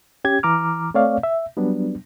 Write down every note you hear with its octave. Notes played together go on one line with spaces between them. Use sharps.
C#4 G4 G#6
E3 A#5 D6 F6
A3 C4 C#5 D5 F5
E5
F#3 G3 B3 D4